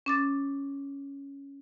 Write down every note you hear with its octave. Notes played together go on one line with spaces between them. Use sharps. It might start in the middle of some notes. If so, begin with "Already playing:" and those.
C#4 D6 A6